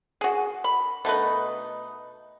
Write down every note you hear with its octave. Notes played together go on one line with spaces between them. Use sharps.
F#4 G#4
B5
B2 A3 D#4 B4